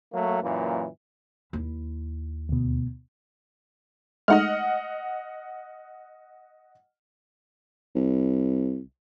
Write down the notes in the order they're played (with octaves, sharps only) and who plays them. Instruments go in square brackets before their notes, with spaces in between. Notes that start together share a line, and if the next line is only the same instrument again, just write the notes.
[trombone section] F#3 A3 A#3
F#2 A#2 E3 A#3
[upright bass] D#2 E4
[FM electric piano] D2 B2
[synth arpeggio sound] G#3 A3 D#4 [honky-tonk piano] D#5 F#5 F6
[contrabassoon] C2